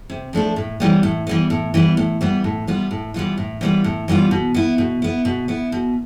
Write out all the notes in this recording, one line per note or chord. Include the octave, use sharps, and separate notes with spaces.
C3
F3 A3 D4 A4
A2
E3 G3 B3
A2
E3 G3 B3
A2
E3 G3 B3
A2
E3 G3 B3
A2
E3 G3 B3 F4
A2
E3 G3 B3 F4
A2
E3 G3 B3 F4
A2
E3 G3 B3 F4
B2
B3 E4
B2
B3 E4
B2
B3 E4
B2